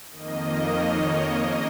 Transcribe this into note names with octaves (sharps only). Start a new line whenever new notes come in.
F2 D#3 A#3 D#5
C#5
C#5
C#3 A#3 D#5